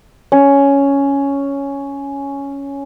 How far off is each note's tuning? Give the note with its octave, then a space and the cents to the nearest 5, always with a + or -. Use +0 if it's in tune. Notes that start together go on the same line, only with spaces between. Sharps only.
C#4 +5